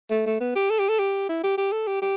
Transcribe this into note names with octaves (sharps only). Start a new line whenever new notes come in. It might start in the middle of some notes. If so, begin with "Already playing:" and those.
A3
A3
B3
G4
A4
G4
A4
G4
E4
G4
G4
A4
G4
G4